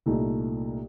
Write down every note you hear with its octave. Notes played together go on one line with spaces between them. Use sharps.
C2 A#2 A3 D#4